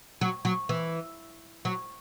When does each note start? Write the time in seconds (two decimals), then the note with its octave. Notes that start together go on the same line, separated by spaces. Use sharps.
0.21 F#3
0.45 F#3
0.69 E3
1.65 F#3